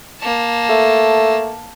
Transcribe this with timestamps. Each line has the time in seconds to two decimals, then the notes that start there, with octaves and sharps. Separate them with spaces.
0.20 A#3 A5
0.69 A3